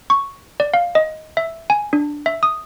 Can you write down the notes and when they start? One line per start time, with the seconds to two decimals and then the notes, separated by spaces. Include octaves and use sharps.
0.10 C#6
0.60 D5
0.74 F5
0.95 D#5
1.37 E5
1.70 G#5
1.93 D4
2.26 E5
2.43 D#6